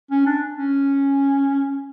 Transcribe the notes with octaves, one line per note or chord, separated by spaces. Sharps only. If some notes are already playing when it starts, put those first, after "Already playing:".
C#4
D4
C#4